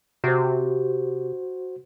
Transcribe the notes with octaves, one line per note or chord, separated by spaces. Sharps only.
C3 F#4 C5